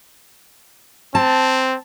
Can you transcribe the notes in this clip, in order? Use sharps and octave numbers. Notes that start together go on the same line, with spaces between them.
C4 A5